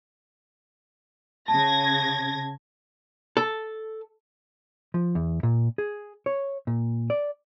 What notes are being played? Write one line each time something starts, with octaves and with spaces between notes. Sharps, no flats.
C#3 A5 G#6 A#6
A4
F3
E2
A#2
G#4
C#5
A#2
D5